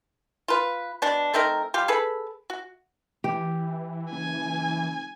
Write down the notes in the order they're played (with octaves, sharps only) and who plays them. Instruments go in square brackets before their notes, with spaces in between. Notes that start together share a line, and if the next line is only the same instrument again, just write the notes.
[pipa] F4 B4
B2 D4
A3 C4 D#4 A#4
G3 F4 G4 F5
G#4 A4 B4 B5
F#4
[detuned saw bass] E3 [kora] G4
[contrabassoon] F#1 [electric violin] G#5